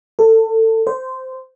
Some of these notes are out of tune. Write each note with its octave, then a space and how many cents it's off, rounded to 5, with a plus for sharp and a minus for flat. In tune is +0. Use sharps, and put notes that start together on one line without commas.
A4 +25
C5 -15